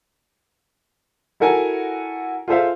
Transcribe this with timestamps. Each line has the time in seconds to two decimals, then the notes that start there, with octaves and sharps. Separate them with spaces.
1.40 E4 F#4 A4 A#4 G#5
2.48 F4 G#4 A4 C5 E5 F5